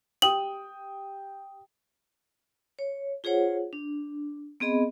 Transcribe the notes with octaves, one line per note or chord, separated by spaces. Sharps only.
G4 G5 D#6 F#7
C#5
F4 G#4 C5 C#5 F#5
D4
B3 C4 G#4 D#5 B5